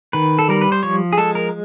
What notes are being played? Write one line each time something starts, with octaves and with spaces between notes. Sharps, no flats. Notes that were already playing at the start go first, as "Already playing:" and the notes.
D#3 B4
A4
G3 A#4
B4
C5
F3 C#5
G#4
G#3 A4
A#4